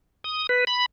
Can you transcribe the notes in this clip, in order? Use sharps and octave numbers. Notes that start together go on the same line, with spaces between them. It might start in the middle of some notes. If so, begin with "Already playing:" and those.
D#6
B4
B5